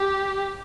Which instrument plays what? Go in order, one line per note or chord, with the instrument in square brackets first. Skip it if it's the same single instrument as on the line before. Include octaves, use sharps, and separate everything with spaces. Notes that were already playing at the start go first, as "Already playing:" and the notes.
Already playing: [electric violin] G4